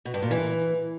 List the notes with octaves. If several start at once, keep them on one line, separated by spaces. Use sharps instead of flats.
B2
G2
A#2
E3